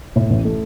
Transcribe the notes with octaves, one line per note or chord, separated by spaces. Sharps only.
A2
A1
A3